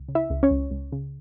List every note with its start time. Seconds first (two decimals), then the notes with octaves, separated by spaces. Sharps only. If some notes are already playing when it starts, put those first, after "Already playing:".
Already playing: C#2
0.08 C#3
0.15 E4 E5
0.30 C#2
0.43 C#4 C#5
0.51 C#2
0.71 C#2
0.92 C#3